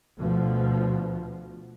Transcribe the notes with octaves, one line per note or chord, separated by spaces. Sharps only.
D2 B2 F3